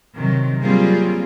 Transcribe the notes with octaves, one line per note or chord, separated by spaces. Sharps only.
C3 D#3 F#3
F#3 G3 A#3 C4 F4 G#4